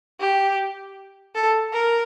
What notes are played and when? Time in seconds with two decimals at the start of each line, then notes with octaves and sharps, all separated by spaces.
0.20 G4
1.35 A4
1.73 A#4